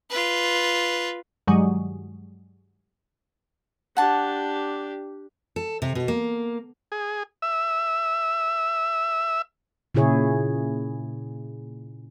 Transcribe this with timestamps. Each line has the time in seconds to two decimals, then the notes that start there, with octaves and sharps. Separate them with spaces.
0.10 F4 B4
1.47 G2 D#3 F#3 G#3
3.97 D4 G4 F#5 A5
5.56 A4
5.82 C3
5.95 B2
6.08 A#3
6.92 G#4
7.42 E5
9.95 A#2 C#3 E4 G#4 C#5